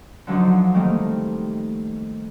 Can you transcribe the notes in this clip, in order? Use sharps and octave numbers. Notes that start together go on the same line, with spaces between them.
D3 F3 F#3 D4 D#4
D#3 G3 A3 A#3 C4 D#4